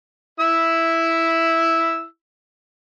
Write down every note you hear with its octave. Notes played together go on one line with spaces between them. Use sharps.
E4 E6